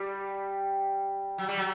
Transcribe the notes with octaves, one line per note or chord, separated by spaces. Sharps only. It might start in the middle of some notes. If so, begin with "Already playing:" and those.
Already playing: G3
F#3
G3
F#3